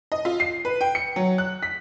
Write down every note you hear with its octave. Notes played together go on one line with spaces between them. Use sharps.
D#5
F4
C7
B4
G5
C#7
F#3
F#6
B6